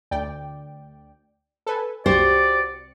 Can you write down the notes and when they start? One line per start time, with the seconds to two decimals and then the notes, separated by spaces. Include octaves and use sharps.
0.11 D2 D5 G5
1.66 A4 B4 G#5
2.06 C2 F#4 G4 C5 D5 C#7